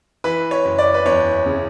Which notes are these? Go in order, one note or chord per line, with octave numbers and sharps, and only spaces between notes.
E3 B4
C#5
F#1
D5
B4
E2 C#5
C#3